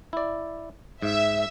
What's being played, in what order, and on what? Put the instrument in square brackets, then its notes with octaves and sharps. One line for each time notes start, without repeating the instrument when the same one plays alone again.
[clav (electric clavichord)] E4 D5
[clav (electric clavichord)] G#2 [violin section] E5